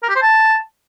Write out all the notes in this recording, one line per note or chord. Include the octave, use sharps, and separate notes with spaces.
A#4
G4
C5
A5